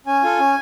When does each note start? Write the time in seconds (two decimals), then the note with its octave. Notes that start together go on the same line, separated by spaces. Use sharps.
0.06 C#4 G#5
0.23 F4 A4
0.39 C#4